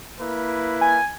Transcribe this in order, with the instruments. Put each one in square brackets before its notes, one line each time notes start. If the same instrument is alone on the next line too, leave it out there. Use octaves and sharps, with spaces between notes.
[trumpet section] A#3 E4 B4
[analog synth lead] G#5